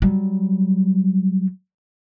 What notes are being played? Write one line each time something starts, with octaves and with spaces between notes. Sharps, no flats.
F#3 G3